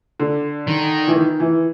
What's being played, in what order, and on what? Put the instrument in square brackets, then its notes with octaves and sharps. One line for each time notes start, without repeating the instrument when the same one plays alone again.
[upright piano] D3
[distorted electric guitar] D#3
[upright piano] E3
D#3
E3